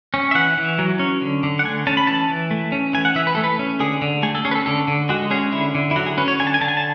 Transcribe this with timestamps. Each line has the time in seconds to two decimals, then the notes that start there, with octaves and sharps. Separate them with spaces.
0.14 C#4
0.31 E5
0.35 E3 F#5
0.57 E3
0.79 F#3
0.99 C#4
1.21 D3
1.43 D3
1.59 F#5
1.64 A3 G#5
1.87 C#4 A5
1.97 B5
2.07 E3 A5
2.29 E3
2.51 A3
2.72 C#4
2.93 E3 G#5
3.05 F#5
3.15 E3 E5
3.27 B4
3.35 A3 A4
3.44 B4
3.59 C#4
3.80 D3 G#4
4.02 D3
4.23 A3 G#4
4.35 A4
4.45 C#4 G#4
4.51 B4
4.55 A4
4.66 D3 A4
4.88 D3
5.09 G#3 F#4
5.31 C#4 G#4
5.52 D3 E4
5.75 D3
5.91 E4
5.96 F#3 F#4
6.06 G#4
6.18 C#4 B4
6.28 C#5
6.39 D3 G#5
6.47 A5
6.54 G#5
6.61 D3 A5
6.68 G#5
6.77 A5